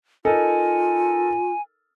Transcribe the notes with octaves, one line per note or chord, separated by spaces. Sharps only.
D#4 F4 A4 A#4 G#5